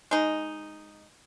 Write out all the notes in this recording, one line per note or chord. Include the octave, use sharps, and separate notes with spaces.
G#3 D#4